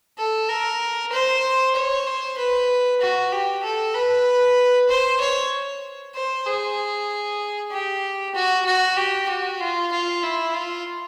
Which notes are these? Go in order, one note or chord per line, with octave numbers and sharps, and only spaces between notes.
A4
A#4
C5
C#5
C5
B4
F#4
G4
A4
B4
C5
C#5
C5
G#4
G4
F#4
F#4
G4
F#4
F4
F4
E4
F4